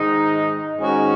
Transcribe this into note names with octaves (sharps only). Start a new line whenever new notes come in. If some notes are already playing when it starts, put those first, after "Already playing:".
Already playing: G#2 D#3 G#3 D#4
G#2 D#3 G#3 C#4 F#4